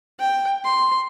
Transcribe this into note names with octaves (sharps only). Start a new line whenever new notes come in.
G5
C6